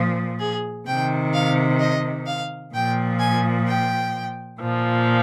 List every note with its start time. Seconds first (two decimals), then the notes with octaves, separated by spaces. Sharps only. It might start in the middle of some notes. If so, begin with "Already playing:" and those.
Already playing: A#2 F3
0.40 G#4
0.86 C3 G5
0.92 D#3
1.33 F5
1.80 D#5
2.26 F5
2.74 A#2 F3 G5
3.19 G#5
3.66 G5
4.59 A#2 F3